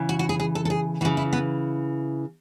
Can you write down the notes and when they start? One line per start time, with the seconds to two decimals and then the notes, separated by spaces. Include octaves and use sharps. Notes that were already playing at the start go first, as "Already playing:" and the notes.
Already playing: C#3 E3
0.09 F#4
0.19 F#4
0.29 G#4
0.40 G#4
0.55 A4
0.65 A4
0.70 G#4
1.01 E3 F#4
1.05 C#3
1.17 E4
1.33 B3